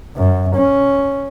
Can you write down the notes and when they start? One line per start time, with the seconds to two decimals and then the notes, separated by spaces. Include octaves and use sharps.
0.16 F#2
0.55 C#4